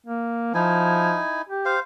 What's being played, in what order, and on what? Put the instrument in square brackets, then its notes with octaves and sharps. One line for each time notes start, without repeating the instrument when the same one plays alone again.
[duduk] A#3
[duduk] F3 [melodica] D#4 E4 G#5
[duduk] G4
[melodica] C5 F5